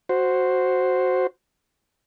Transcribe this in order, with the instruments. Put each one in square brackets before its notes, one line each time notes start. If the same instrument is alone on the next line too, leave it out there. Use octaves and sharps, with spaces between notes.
[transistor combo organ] F#4 C5